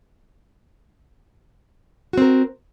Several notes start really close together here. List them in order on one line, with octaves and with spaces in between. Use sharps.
F#4 C4 A#4